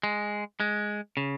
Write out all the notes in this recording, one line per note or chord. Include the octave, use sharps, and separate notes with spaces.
G#3
G#3
C#3